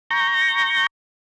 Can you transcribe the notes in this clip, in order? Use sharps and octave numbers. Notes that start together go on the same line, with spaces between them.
A#5 C#6 G6 A#6